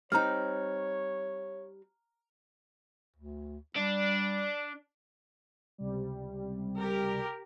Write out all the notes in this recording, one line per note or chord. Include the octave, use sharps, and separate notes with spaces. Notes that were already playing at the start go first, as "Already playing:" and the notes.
G3 C4 D#4 C#5 A#5 F6
D2
G3 D4
C#2 C3 G3
G4 A#4